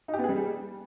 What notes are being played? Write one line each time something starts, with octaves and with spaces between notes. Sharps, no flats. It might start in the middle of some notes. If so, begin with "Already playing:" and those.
D#4
G4
B3
G#4
G3